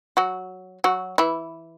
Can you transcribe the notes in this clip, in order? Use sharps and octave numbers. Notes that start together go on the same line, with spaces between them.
F#3 F#4
F#3 F#4
E3 E4